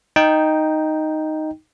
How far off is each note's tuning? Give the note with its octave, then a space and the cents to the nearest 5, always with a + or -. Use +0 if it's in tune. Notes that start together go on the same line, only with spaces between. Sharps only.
D#4 +0 G5 +0